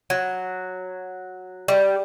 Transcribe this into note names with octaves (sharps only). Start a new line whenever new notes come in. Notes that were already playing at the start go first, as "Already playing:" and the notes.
F#3
G3